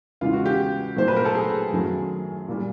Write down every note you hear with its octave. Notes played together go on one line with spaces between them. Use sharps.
E2 C#3 E3 G#3 F4
F#4
G4
A#2 F#3 A3 C5
B4
A#4
A4
G#4
F#2 D#3 F#3 A3
A#2 G3